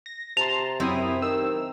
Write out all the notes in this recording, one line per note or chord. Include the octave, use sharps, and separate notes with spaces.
A#6
C3 A5 A#5 C6 F7
F#2 C4 E4 E5 D#6
D#3 E6